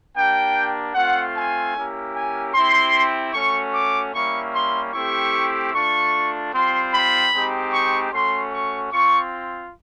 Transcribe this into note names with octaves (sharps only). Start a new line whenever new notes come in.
A#3 D4 G4 G5
A3 C4 F4 F#5
G#5
A#3 C#4 E4 G4
G#5
C4 E4 G4 C6
A3 C#4 F#4 C#6
D6
G3 A#3 C#4 E4 C#6
C6
A3 C4 E4 G4 C#6
A3 D4 F4 C#6
G3 C4 F4 C6
B5
G#3 C4 D#4 G4
C#6
A3 C#4 F#4 C6
C#6
C4 F4 C#6